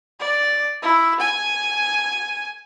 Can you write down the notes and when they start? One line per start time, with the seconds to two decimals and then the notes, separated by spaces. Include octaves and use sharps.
0.20 D5
0.82 E4
1.20 G#5